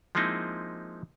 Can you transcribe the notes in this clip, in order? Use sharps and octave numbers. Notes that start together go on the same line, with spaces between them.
F3 G#3 A#3 C4 D#4 E4